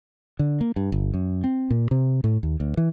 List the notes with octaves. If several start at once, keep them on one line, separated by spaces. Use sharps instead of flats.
D3
A#3
G2
G1
F#2
C4
A#2
C3
A2
D#2
D2
E3